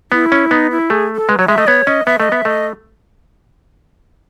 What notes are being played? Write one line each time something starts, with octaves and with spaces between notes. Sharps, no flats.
B3 E4
C#4
B3 D#4
E4
A3 G#4
A4
G#3 B4
F#3 C#5
G#3 E5
A3 D#5
B3 C#5
C#4 D#5
B3 E5
A3 D#5
B3 E5
A3 D#5